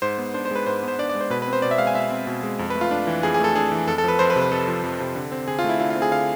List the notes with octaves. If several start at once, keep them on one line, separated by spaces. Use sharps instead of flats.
G#2 C5
B3
D4 C5
C5
G#3 B4
G#2 C5
B3
C5
D4 D5
D5
G#3
C5
B2 B4
B4
C4
C5
B2 D5
E5
G#3 F5
G#5
B2 E5
C4
B2
G#3
F2
B4
A3
F4
D4
E3
F2 G#4
G#4
A3 A4
D4 G#4
E3
F2 A4
A4
F3 B4
F2 C5
B4
C3
B4
F2 A4
F3
F2
C3
D3
C4
D3 G#4
F4
A3
E4
D3 F4
F4
C4
G#4
D3 F5